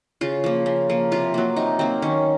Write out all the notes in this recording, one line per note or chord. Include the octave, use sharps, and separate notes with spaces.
C#3 F4
F3 A#3
C#3
F3 A#3
C3 F4
F#3 A#3
C3 D#4
F#3 A#3 C4
D#3 C#4